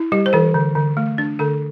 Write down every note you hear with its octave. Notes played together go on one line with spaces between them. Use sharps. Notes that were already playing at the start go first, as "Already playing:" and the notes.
Already playing: E4
G3 G4
C5
E3 A4
D3
D3
A3
D4
D3 A4